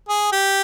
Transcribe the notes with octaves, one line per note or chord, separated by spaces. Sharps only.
G#4
G4